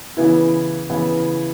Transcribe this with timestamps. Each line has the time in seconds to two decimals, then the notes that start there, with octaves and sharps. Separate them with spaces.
0.17 C#3 E3 B3 E4
0.90 C#3 E3 B3 E4